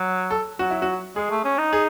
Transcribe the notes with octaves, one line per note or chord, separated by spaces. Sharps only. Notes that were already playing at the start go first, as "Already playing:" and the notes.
Already playing: F#3
A4
F#3 F#4
E4
F#4
G#3 G#4
A3
C#4
D#4
G#4